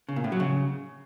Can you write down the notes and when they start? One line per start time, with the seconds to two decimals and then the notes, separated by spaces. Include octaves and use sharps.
0.09 C#3
0.16 A#2
0.24 A2
0.32 F#3
0.40 C#3